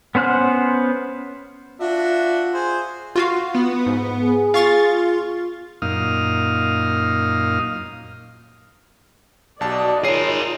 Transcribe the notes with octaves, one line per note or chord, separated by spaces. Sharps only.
B3 C#4 C5 F#5 F6
D4 F4 F#4 E5
G#4 C5
F4 F#4 F5
B3
G#2
G#4
F4 F5 C#6 A6
F#2 A#2 D#4 F5 D#6 F6
B1 F#4 D5 D#5 A5
D#4 F4 G#4 A#4 C#5 C7